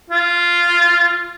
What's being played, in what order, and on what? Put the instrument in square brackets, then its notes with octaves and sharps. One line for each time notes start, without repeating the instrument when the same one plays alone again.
[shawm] F4